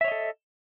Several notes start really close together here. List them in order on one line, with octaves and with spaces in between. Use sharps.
E5 C#5 D#5 A4